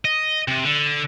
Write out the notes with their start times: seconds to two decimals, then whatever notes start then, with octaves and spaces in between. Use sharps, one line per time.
0.05 D#5
0.48 C3
0.65 D3